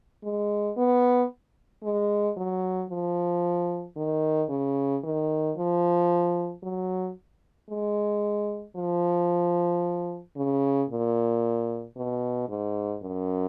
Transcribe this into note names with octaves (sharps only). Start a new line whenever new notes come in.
G#3
B3
G#3
F#3
F3
D#3
C#3
D#3
F3
F#3
G#3
F3
C#3
A#2
B2
G#2
F#2